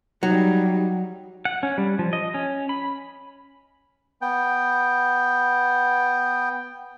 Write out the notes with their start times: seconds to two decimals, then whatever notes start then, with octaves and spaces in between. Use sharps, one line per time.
0.23 F#3 G3 D#4
1.45 F#5
1.63 C#4
1.78 G3
1.99 F3
2.13 D#5
2.34 C#4
2.69 B5
4.22 B3 G5